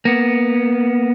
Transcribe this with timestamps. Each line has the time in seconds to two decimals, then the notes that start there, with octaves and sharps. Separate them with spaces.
0.05 A#3 B3